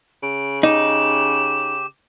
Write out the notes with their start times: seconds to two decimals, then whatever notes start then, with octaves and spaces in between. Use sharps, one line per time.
0.23 C#3 D7
0.63 D#4 G4 E7